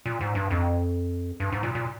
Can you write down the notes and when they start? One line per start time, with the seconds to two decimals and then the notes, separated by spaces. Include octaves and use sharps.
0.06 A#2
0.21 G#2
0.35 G2
0.51 F2
1.40 G2
1.52 G#2
1.63 A#2
1.75 A#2